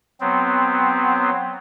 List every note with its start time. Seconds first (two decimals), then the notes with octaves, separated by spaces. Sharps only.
0.21 F#3 B3 C4